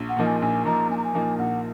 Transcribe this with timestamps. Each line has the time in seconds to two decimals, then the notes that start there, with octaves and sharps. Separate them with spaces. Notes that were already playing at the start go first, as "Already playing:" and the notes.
Already playing: A#1
0.09 F#5
0.17 A#2 F3 A#3 D#4
0.25 G#5
0.41 A#1 G#5
0.65 A#2 F3 A#3 D#4 A#5
0.89 A#1 G#5
0.97 A#5
1.04 G#5
1.14 A#2 F3 A#3 D#4
1.39 A#1 F#5